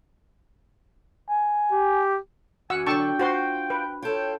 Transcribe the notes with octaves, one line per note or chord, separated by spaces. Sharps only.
G#5
G4
F#2 E3 F#4 F#5 G#5 E6
D3 F#3 D4 G5 A5 C#6 E6 G6
F4 F#4 C5 C6
B4
F4 A4 C#5 G5